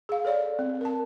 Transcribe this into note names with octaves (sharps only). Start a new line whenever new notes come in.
G#4 F5
A4 C#5 D5 F5
C4
A#4 A5